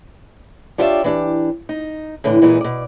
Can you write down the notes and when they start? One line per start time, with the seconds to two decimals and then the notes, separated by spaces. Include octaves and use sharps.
0.78 D4 F4 G4 C#5 D5 E5
1.04 E3 D4 G4
1.69 D#4
2.24 A2 D3 E3
2.41 E2 A#2 E3 G#3 D#4
2.61 B2 D5